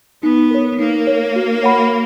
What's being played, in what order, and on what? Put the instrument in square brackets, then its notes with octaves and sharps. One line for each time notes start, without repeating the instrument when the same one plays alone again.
[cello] B3 [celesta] D#4
[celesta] A#4 C#5
[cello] A#3 [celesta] D#4
[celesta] A#4 C#5
F#4
C#5 F#5 B5